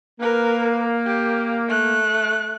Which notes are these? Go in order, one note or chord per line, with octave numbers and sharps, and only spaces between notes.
A#3 A#4 B4
G4
A3 F#6